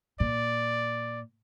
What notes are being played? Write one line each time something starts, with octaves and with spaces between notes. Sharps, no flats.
A#2 D5